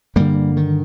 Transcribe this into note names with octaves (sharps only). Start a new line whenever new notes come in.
G2 D3 G3 A#3
D#3